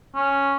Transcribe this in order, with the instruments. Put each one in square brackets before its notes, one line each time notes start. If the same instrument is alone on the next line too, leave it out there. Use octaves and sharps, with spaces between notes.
[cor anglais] C#4